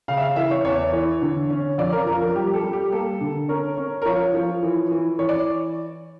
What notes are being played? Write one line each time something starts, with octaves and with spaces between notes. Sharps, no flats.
C#3 F5
E5
F5
E3 E5
C#5
E2 C#5
E3
D3
C#4
F2 D5
A#4
F3 A#4
A#4
G3 G4
A4
G3
G4
A#3 A4
D3
C#4 A#4
C#4
A#4
F3 C#5
F3
E3
E3
E3 C#5
D5